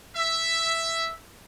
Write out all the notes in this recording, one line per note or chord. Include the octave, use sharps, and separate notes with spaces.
E5